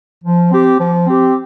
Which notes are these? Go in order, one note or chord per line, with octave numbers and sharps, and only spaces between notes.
F3
C4 G4
F3
C4 G4